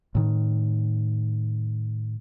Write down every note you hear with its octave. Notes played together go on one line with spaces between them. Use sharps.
A2 D#3